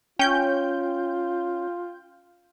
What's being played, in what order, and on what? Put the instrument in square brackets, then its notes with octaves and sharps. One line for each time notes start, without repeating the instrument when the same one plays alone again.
[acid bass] C#4 [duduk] F4 [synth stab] G5 G6